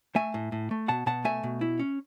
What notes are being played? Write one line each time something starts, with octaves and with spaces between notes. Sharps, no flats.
A3 E5 G#5
A2
A2
A3
B2 F#5 A5
B2 F#5 A5
A3 E5 G#5
B2
E4
C#4